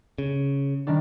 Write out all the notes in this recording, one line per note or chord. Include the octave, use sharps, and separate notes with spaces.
C#3
D#3 G3 D4